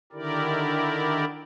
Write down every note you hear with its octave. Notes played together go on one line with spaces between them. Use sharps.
D3 D#3 E4 G4 A#4 D5